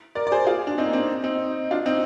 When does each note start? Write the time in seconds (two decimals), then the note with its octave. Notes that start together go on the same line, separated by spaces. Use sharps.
0.15 A#4 D5
0.27 D5
0.32 G#4 C5
0.47 F4 G#4
0.67 D4
0.78 C4 D#4
0.86 A#3
0.93 C4
1.24 C4 D#4
1.71 D4 F4
1.86 C4 D#4